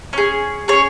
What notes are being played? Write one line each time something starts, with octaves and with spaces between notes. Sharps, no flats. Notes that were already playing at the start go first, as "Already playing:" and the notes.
C#4 G#4
C#4 G#4 C#5